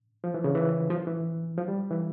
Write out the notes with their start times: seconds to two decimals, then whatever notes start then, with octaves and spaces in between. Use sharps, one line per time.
0.24 F3
0.34 E3
0.44 C#3
0.55 E3
0.90 F3
1.07 E3
1.57 F3
1.68 G3
1.90 E3